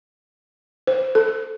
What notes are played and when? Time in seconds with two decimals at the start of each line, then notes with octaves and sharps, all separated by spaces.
0.87 C5
1.15 A4